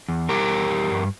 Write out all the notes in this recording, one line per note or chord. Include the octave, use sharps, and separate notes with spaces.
E2
G3 G4 A#4
E2
G3
G2